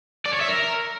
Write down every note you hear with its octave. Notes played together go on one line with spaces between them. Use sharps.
D5
C#5
E5
A#4